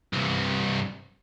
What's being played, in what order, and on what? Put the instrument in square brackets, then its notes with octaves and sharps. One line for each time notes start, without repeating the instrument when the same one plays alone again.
[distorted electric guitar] C2 G2